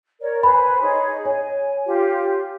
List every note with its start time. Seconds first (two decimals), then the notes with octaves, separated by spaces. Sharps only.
0.20 A#4 C#5 D5
0.43 B4 C5 G#5 B5
0.80 D#4 G#4 C#5
1.25 C#5 G#5
1.85 F4 G4